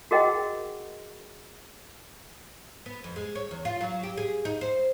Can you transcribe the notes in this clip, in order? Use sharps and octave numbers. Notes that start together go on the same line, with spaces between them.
F#4 G#4 A#4 D#5 F#5 G5
B3
F2
G#3
C#5
E2
F4
F#3
G4
G#4
D#4
C5